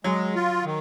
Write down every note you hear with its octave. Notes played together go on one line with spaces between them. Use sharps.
F#3 G#3
F4
D#3